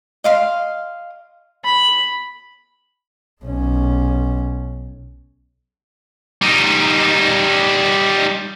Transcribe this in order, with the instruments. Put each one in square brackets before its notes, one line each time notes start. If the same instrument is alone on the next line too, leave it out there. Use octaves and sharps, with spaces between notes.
[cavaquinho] D#5 F5 C6
[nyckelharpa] B5
[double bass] B1 C#4
[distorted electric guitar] G3 D#4